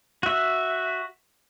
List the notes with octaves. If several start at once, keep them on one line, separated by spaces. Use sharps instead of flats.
F#4 E5